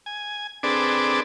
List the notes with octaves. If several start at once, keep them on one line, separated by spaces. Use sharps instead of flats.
G#5
C4 D4 G#4 A4 B4 D5